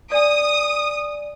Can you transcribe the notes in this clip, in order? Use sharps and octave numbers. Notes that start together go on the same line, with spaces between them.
D5 G#5 D#6